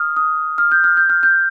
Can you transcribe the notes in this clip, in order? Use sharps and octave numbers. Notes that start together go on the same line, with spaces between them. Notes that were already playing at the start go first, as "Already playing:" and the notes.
Already playing: D#6 F6
D#6
F6
G6
F6
G6
F6
G6